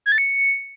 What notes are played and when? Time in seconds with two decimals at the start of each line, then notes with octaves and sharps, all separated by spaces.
0.06 G#6
0.12 A6
0.18 C#7